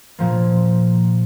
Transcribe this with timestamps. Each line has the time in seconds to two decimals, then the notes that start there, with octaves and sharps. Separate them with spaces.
0.19 A#2 F3 A#3